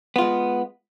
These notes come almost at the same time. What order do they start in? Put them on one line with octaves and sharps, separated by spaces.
B3 F4 G#3